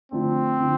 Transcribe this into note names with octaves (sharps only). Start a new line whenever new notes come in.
D3 F3 A3 C4 D4
D3 F3